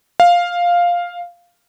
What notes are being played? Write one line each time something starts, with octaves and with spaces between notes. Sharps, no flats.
F5